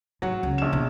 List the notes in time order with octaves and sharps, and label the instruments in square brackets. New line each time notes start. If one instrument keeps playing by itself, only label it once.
[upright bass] G#2 [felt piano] F#3 F#5
[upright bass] C#2
[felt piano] A#1 E7
[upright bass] B2 D3